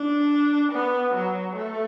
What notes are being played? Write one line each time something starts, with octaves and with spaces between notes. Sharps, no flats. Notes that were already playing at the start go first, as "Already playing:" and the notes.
Already playing: D4
B3
F#3
A3